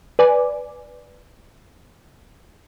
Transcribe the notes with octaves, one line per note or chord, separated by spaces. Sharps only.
B4 D5 G#5 D6